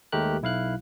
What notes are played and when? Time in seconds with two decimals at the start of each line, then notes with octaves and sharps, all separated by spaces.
0.12 D#2 G#3 A3 G4 A#4 F#6
0.42 B1 E4 F5 F#6